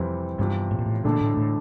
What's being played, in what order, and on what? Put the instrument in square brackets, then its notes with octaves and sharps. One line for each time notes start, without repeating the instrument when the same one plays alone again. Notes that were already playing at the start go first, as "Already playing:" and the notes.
Already playing: [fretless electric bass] F2 [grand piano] C3 E3 G3 C4
[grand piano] E2 C3 F3 [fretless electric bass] G2
[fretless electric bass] A2
A#2
A2
[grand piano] E1 D2 D3 A3 D4 [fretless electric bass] A#2
[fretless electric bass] A2
A2